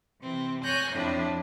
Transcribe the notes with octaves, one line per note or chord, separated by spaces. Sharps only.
C3 E3 C4
C#5 G#5 F#6 G6 A#6
F2 A2 F3 D4 E4